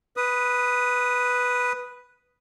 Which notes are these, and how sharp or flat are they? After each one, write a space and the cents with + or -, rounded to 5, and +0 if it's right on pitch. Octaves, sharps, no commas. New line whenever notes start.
B4 +0 D#6 +0